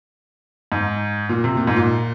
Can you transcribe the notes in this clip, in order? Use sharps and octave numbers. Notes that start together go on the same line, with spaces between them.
G#2
A#2
C3
A#2
G#2
A#2